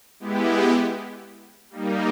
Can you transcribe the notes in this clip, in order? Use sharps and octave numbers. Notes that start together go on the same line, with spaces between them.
G#3 B3 E4 G4
G3 A#3 D#4